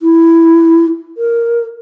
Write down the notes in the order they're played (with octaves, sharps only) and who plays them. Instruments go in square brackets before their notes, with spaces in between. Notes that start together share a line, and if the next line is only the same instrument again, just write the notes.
[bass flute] E4
A#4